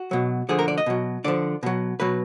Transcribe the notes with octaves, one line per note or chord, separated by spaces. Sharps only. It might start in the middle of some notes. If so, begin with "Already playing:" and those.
Already playing: F#4
B2 F#3
D3 F3 G#4
A#4
D5
D#5
B2 F#3
D3 F3 D5
B2 F#3
B2 F#3 B4